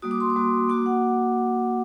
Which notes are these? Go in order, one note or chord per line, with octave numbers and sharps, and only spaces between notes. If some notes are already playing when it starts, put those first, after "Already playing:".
G3 A#3 F#4 D#6
D6
C6
D6
G3 A#3 F#4
A#3 F#4 D6
F#5